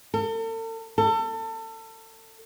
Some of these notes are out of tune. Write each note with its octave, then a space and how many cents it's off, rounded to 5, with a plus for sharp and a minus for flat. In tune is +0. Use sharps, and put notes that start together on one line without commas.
A4 +40
A4 +30